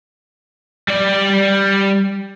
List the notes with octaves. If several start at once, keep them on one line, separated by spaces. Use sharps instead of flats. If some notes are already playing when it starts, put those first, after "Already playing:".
G3 D5